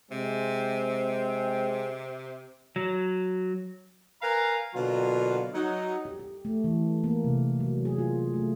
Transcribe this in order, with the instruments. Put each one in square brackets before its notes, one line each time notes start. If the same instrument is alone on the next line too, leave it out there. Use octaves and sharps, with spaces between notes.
[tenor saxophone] C3 [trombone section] G#3 C4
[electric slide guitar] F#3
[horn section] A#4 B4 F5 G#5 A#5
B2 D3 F#3 A#3 F4
F#3 D#4
[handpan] G4
G4
A3
E3
A#3
C3
F#3
G#4
F4
A3